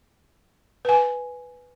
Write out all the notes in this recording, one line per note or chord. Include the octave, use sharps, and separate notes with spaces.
B4 G#5